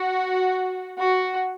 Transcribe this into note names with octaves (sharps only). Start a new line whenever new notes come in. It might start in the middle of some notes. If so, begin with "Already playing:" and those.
Already playing: F#4
F#4